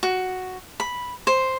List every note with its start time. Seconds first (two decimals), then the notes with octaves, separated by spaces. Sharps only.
0.03 F#4
0.80 B5
1.27 C5